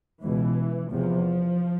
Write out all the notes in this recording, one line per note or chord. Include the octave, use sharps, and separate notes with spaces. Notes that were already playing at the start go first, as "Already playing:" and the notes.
C#2 B2 E3
E2 C3 F3